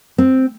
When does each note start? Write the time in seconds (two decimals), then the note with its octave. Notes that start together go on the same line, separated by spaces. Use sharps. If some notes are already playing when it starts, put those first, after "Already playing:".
0.18 C4